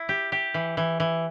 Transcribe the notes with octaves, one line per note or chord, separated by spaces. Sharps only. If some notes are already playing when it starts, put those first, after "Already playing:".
Already playing: E4
G4
G4
E3
E3
E3